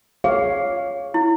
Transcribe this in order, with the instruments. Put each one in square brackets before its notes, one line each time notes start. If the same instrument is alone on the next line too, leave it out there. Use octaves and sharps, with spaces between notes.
[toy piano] G#4 [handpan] C#5 F5
[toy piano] E4